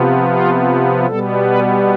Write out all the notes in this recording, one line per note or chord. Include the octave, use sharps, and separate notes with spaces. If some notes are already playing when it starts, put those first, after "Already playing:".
Already playing: C3 F3 B3
F4
B2 G3 B3 A4
B4